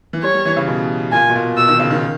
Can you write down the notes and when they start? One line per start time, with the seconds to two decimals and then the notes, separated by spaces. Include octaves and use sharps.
0.13 E3
0.23 G3 C#5
0.34 G3
0.45 E3
0.57 C#3
0.68 B2
1.12 A#2 G#5
1.30 B2
1.35 A#2
1.57 B2 E6
1.68 D#3
1.79 C#3
1.90 D#3